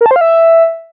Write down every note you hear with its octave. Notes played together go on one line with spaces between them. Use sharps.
A#4
A5
C5
F5
E5